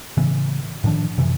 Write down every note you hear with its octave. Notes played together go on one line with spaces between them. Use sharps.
A2 C#3 E3 B3
A2 D#3 F3 D4
F#2 C3 E3